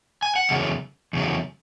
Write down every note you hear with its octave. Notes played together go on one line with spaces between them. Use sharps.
G#5
F#5
E2 C#3 F#3
E2 C#3 F#3